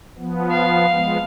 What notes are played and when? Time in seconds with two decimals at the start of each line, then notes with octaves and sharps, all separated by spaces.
0.18 F3 B3
0.51 F5
0.92 F3 G#3 B3